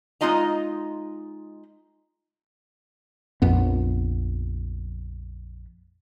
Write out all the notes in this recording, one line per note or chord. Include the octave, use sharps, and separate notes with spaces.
G#3 C#4 D#4 F4 D#5 A#5
A#1 F2 B3